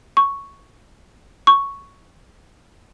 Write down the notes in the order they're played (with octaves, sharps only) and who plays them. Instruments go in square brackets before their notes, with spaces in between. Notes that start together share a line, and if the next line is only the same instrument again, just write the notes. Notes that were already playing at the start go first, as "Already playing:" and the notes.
[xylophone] C#6
C#6